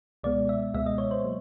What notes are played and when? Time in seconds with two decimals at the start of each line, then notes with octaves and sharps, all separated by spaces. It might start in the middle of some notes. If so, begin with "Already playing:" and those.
0.23 C#2 B2 G#3 B3 D5
0.49 E5
0.74 C#2 B2 G#3 B3 E5
0.86 D#5
0.98 C#5
1.11 C5
1.24 F#3 A#3